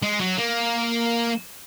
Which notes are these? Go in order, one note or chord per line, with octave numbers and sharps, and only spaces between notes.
G#3
F#3
A#3